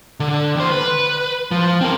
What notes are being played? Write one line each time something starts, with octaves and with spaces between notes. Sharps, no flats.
D3
D#2 C5
B4
F3
C4 A#4